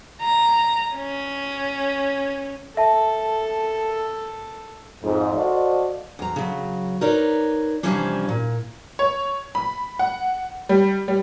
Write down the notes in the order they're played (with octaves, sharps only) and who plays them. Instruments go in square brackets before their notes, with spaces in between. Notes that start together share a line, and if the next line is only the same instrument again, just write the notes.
[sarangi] A#5
C#4
[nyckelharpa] A4 [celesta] E5 A5
[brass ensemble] F2 G#2
F#4 A4 C5 D5 D#5 F5
[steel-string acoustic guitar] E2 A#5
C#3 F#3
D#4 A#4 B4 C#5 D5
C3 E3 F3 G3 C#4 D4
A#2
[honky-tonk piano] C#5
B5
F#5
G3
G3